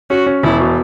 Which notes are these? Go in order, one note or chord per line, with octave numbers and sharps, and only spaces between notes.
C#4 F#4
C#4
E1 E4
B2